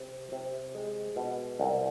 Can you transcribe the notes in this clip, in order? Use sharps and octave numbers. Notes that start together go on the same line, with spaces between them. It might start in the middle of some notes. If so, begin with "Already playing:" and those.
Already playing: C3
C3
G#3
B2
C2